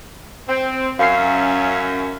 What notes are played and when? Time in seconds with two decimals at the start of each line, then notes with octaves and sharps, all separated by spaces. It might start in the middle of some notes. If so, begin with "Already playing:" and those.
0.48 C4
0.99 F#2 C#4 E5 F5 C7